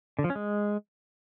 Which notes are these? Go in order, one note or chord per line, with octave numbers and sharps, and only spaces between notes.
D3
F3
C#4
G#3